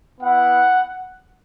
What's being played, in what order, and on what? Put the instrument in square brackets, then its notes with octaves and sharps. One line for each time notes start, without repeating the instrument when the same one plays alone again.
[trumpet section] B3 E4 F#5